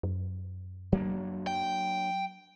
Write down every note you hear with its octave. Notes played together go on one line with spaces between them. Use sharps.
F#2
F#3 A#3 D4
G5